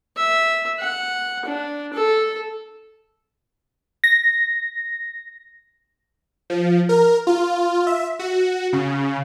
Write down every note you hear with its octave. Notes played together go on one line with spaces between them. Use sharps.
E5
F#5
D4
A4
A#6
F3
A#4
F4
E5
F#4
C#3